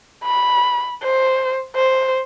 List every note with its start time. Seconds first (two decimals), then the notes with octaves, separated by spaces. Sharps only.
0.24 B5
1.03 C5
1.75 C5